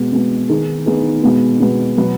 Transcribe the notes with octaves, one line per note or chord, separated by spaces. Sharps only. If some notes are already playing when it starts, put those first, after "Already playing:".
Already playing: B2 G#3 B3
B2 G#3 B3
D#3 B3 D#4 G#4
D#3 B3 D#4 G#4
B2 G#3 B3
B2 G#3 B3
B2 F#3 B3 F#4